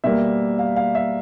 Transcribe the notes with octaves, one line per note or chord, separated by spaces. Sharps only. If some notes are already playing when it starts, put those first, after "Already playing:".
B2 G3 A#3 E5
F5
F5
E5